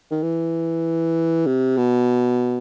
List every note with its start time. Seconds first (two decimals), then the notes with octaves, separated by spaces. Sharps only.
0.11 D#3
0.23 E3
1.47 C3
1.77 B2